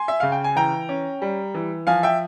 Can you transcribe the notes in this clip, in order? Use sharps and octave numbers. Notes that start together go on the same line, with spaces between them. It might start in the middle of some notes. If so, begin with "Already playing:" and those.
Already playing: G#5 C6
E5
C#3 F5
G5
G#5
E3 G5 A#5
C#4
G3
E3
F3 F5 G#5
E5 G5